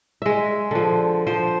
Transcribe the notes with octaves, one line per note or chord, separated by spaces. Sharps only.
G#3 E5
D3 F3
F3 C5